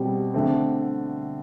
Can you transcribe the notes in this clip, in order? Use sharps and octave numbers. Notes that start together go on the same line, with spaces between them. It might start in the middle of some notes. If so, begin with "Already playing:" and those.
Already playing: B2 G3 C4 G4
D3 A3 C4